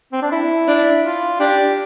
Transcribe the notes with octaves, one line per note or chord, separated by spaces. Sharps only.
C4
D4
E4
D4
F4
D4 G4